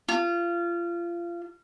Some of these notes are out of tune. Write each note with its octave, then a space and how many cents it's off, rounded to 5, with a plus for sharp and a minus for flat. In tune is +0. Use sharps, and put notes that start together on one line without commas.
F4 -25